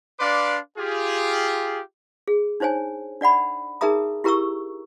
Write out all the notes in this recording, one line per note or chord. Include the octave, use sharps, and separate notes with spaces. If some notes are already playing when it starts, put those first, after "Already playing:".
D4 B4 D5 F5 C6 D6
F4 G4 G#4
G#4
D4 D#4 C5 C#5 G#5
D4 D5 F#5 B5
D#4 G#4 A#4 E5 A#5 D#6
E4 G4 A#4 A#5 C#6 E6